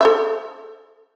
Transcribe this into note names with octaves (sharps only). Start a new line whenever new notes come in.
A4 C5 E5